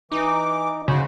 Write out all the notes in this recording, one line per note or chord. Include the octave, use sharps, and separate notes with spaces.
E3 D#4 D6
C#3 F#4 C5